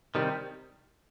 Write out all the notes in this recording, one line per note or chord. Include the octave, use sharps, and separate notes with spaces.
C3 D#3 G3